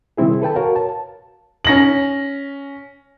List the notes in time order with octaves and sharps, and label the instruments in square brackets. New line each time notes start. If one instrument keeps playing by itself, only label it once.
[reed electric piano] C3 D#3 G3 C4 E4 G#4
A4 B4 G5 A5
F#4 A#4 C#5 F5
A5
[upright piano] C#4 A#6 F#7